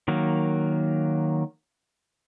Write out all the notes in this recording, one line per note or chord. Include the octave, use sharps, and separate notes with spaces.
D#3 F#3 A#3